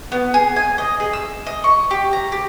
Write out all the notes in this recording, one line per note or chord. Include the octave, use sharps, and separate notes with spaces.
B3
G#4
G#5
D#5
G#4
E6
D#5
C#6
G4
A#5
G4